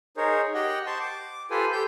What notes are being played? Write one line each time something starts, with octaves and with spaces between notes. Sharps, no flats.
D#4 G#4 A#4 C5 C#5
G4 D#5 F#5 G5
C5 A5 C6 C#6
D6
F4 G4 A4 B4 C5 G#5
G4 A4 C5 G5 G6